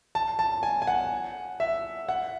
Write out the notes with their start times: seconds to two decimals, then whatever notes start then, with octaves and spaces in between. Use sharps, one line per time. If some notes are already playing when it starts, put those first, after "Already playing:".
0.15 A5
0.39 A5
0.63 G#5
0.82 G#5
0.87 F#5
1.60 E5
2.09 F#5